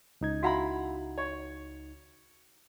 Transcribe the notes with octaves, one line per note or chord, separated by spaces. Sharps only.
C#2 D#4 G#6
E4 F#4 F5 F#5 A#5 B5
C#5